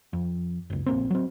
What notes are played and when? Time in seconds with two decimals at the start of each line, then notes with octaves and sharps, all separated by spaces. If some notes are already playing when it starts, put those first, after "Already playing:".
0.13 F2
0.70 F#1 C#2
0.86 A#1 A#3 C4
1.11 F#3 C4